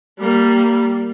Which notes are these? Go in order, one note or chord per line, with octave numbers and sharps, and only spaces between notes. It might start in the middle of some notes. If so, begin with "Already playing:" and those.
G3 A#3